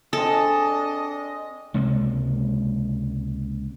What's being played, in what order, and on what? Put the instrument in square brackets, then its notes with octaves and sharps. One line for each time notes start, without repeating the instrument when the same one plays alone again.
[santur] C4 G#4 [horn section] D4 D#5 [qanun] A4
[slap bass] C#2 C3 G#3 A#3